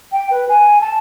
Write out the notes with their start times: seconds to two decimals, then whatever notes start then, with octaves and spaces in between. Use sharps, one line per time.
0.12 G5
0.31 B4
0.49 G#5
0.81 A5